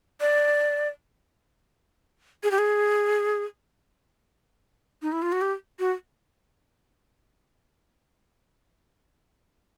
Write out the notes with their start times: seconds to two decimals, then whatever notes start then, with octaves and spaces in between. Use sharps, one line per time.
0.21 D5
2.43 G#4
2.51 G4
2.58 G#4
5.02 D#4
5.12 E4
5.22 F4
5.32 F#4
5.42 G4
5.79 F#4